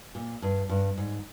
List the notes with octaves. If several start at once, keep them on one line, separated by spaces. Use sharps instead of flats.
A#2
G2
G2
G#2